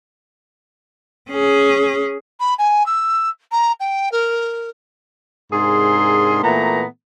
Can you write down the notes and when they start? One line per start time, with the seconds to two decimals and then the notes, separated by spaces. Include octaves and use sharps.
1.31 C#4 G#4
2.40 B5
2.58 G#5
2.86 E6
3.51 A#5
3.80 G5
4.12 A#4
5.52 G#2 C3 D4 G#4 A#4 C6
6.44 A#2 E3 A3 B3 A#5